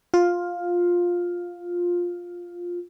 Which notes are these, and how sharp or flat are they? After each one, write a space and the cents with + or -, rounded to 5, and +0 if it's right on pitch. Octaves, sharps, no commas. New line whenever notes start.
F4 +10